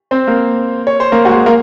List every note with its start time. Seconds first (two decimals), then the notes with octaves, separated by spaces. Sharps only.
0.11 C4 C5
0.27 A#3 A#4
0.87 C#5
1.00 C5
1.12 A#3 A#4
1.25 F#4
1.29 G#3 G#4
1.46 A#3 A#4